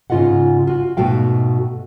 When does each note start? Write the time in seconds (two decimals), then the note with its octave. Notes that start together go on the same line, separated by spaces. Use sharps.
0.10 G#2 C#3 F4 D#5 F5 F#5
0.67 F4 F#4
0.97 G#2 B2 A3 F#4 F5 G5